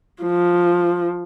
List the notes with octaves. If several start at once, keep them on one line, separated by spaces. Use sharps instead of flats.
F3